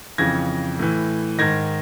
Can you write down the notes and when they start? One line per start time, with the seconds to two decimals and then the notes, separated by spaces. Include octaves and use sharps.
0.18 F2 C#3 E3 G#6 A#6
0.79 A2 E3
1.38 G#2 D#3 G#6 A#6